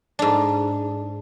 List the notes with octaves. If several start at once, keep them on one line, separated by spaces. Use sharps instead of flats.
G#2 D4